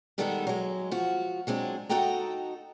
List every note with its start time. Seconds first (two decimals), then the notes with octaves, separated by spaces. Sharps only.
0.18 D#3 G3 G#3 B3 D#4 A4
0.47 F#3 G#3
0.91 F3 F#4
1.47 F#3 G#3 C4 D4
1.89 D#4 F#4 A4 D#5 G5 A#5